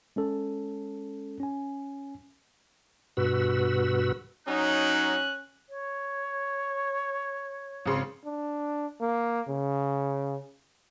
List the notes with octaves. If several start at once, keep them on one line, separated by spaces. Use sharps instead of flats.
G#3 C#4 A4
C#4 G#5
G2 B2 F#4 B4 E6
F#3 C#4 D#4 F#6
C#5
G#1 C#3 C6
D4
A#3
C#3